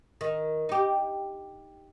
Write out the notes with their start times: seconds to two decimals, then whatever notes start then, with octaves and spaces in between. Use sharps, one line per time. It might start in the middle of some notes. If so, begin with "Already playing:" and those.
0.21 D#3
0.69 D#4 G4